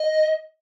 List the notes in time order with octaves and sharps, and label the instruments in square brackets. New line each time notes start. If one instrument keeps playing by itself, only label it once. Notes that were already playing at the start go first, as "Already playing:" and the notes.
Already playing: [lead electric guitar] D#5